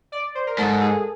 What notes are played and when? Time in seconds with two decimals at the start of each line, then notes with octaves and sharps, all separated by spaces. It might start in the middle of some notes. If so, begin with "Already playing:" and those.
0.12 D5
0.35 C5
0.47 A#4
0.58 G#2 A4
0.81 G#4